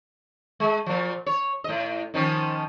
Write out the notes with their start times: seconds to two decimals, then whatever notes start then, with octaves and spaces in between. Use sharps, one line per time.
0.60 G#3
0.86 A#2 F3
1.26 C#5
1.64 A2 D#5
2.14 D#3 F3 C#4